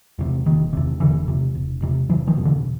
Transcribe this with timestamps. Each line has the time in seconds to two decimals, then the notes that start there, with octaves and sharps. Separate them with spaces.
0.19 E2 C3
0.46 E1 D#3
0.73 E2 C3
1.00 E1 D3 E3
1.28 E2 C3
1.55 E1
1.82 E2 C3
2.09 E1 E3 F#3
2.27 D#3 F3
2.37 E2 B2
2.45 D3 E3